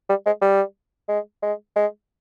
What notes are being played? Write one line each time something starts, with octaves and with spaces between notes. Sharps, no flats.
G3
G#3
G3
G#3
G#3
G#3